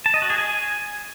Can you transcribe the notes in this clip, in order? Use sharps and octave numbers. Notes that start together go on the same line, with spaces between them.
A5
D#5
F#4
G#4
G#5